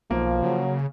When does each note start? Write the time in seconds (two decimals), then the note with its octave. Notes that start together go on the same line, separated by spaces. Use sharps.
0.11 B1 F3 A#3
0.43 C#3 F#3